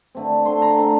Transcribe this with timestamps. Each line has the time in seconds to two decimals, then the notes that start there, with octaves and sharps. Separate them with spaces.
0.15 D3 A3 C4
0.45 D3 A3 C4 C6
0.62 A#5
0.78 D3 A3 C4 A#5